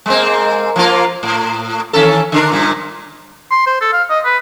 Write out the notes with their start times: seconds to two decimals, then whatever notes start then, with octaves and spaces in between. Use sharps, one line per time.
0.06 G#3 A#3 C4
0.76 F3 A#3 F4
1.23 A2
1.93 D#3 C#4 A4
2.32 D3 D4 A#4
2.52 G2 A#2
3.51 C6
3.67 C5
3.81 A4
3.93 F5
4.10 D#5
4.25 B4